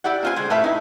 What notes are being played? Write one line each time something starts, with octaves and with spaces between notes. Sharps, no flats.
E4 G4 D5 F#5
A#3 C#4 F4 C5 G#5
D3 G#3 C5
A2 A3 F4 B4 E5
D#4 E4